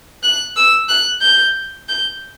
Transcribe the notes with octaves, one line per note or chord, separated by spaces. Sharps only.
F#6
E6
F#6
G6
G6